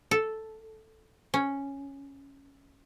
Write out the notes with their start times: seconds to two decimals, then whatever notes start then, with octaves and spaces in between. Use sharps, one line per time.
0.11 A4
1.34 C#4